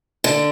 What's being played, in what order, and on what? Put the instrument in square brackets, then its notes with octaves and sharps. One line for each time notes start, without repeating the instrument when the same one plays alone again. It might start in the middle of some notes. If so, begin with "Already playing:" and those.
[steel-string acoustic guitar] D3